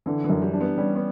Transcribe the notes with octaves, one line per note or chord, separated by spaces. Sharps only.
D3 E3
E3
F#2
G3
D4
B3
G3 C#4
B3